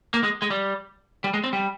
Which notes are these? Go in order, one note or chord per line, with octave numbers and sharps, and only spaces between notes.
A#3
G#3
G#3
G3
G3
G#3
C4
G3